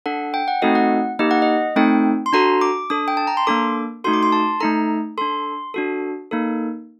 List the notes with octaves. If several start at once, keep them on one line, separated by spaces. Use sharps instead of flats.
D4 A4 F#5
G5
F#5
A3 C4 D#4 F#4 A4 D#5
F#5
A#3 D#4 G4 D#5
F#5
D#5
A3 C4 D#4 A4 G5
C6
D4 F#4 A4 A#5
D6
D4 A4 D#6
G5
A5
A#5
C6
A#3 D4 A4 D6
A3 D#4 F#4 A4 C6
D6
C6
A5
A3 D#4 A4 A#5
D4 A4 C6
D4 F#4 A4
A#3 D#4 A4